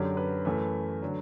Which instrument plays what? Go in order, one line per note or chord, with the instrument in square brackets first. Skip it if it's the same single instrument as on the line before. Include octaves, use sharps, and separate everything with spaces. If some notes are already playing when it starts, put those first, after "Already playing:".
Already playing: [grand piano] F#2 D3 F#3 G4
B4
F#2 E3 A3 B4
D3 F#3